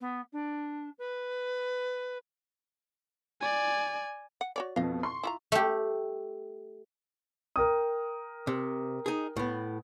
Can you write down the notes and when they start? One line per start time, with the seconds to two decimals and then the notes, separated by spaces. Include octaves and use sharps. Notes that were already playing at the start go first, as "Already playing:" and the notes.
0.01 B3
0.33 D4
0.98 B4
3.41 D5 G#5
4.41 F#5
4.56 F#4 C#5 D5
4.76 F2 B2 F3 D#5 F5
5.03 C6 C#6
5.23 E4 F4 A#5
5.52 A3 G4
7.56 A#4 G5 D#6
8.47 C3
9.06 D#4 G#4
9.36 A2 B3